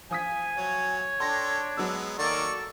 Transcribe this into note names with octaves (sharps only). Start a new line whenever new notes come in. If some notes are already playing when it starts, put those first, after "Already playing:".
F3 G#5 D#6 B6
F#3 C#5
D4 A4 G5 C6 A#6
F#3 G#3 B3 E6
D#3 A#3 A4 D5 C#6